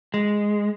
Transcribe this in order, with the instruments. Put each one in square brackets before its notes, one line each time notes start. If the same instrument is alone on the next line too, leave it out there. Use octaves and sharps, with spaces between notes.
[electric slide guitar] G#3